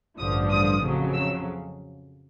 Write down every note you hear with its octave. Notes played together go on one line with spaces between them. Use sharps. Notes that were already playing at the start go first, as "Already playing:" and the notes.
A1 G2 D3 F3 D#6
D#6
F2 C#3 F#3
E6